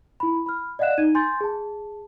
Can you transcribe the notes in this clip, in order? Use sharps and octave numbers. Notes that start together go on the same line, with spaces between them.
E4 B5
B5 F6
D5 D#5 F5 F#5 F#6 E7
D#4 G#6 D#7
G#5 C6 G6 A6
G#4 A5